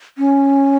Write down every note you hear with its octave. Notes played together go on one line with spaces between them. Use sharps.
C#4